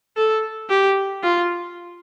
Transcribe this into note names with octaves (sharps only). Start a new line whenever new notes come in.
A4
G4
F4